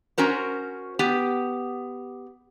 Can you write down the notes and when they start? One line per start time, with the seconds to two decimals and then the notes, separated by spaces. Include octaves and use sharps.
0.18 C#4 F#4 A#4 C5
0.99 B3 G4